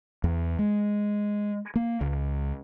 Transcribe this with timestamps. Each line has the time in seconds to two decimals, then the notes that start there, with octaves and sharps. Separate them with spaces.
0.24 E2
0.59 G#3
1.76 A#3
2.01 C#2